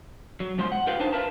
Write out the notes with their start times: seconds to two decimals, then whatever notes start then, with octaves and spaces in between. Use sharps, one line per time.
0.40 F#3
0.58 B2 F3 G#3 C5
0.72 F#5
0.87 F4 G4 A#4 B4 F5 G5
1.00 D4 D#4 B4 C5 A5
1.13 E4 F4 A#4 B4 A5